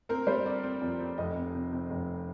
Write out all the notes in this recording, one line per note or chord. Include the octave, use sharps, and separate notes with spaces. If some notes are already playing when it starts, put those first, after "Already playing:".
C4 A#4
G3 C5
C4 D5
C4
F2
C4
F1 D#5
C3
C3
C3
F1